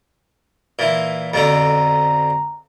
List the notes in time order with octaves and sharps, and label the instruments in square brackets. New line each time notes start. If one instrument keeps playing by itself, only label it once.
[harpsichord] A#2 E3
[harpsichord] F2 B2 D3 [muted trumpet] A#5